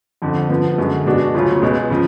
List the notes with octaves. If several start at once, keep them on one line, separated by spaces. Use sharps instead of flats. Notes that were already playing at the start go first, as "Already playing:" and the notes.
F2 D3 F3
D3 F3 B3
F#2 D3 G#3
B2 G#3 D4 F#4
D2 C#3 F#3 C#4 F4
C#2 B2 G#3
C#3 F3